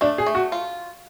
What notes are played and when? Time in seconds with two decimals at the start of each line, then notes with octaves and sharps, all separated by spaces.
0.01 A3 D4
0.18 G#4
0.27 A3
0.35 F#4
0.52 F4